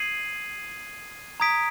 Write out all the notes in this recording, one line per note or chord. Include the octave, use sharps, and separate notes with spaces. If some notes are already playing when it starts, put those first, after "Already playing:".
Already playing: D#6 G#6 C7 D#7 F#7
A#5 D#6 G#6 B6 D7